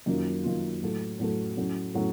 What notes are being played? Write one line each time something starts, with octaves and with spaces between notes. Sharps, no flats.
F#2 D#3 A#3 F4
F#2 D#3 A#3 F4
A2 F#3 A3
A2 F#3 A3
A2 F#3 A3 C#4
A2 F#3 A3 C#4